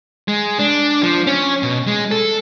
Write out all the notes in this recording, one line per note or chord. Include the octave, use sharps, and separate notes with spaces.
G#3
D4
F3
C#4
B2
G#3
A4